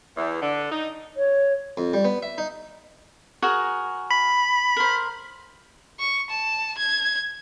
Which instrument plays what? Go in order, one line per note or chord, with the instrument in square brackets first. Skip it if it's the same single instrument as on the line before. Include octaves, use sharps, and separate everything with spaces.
[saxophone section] E2
D3
D#4
[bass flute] C#5
[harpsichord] F2
G3
B3
E5
D#4
[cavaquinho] F#4 G#4 A#4
[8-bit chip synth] B5
[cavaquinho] A#4 C5
[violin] C#6
A5
G#6